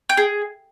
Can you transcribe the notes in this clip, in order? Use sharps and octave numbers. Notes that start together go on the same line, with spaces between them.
G5
G#4